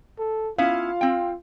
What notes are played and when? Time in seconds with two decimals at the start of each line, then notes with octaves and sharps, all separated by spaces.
0.19 A4
0.58 B3 C#4 E4 F4 F5
1.01 C4 G5